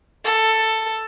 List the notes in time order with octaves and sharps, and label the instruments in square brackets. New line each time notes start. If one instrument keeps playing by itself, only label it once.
[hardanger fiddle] A4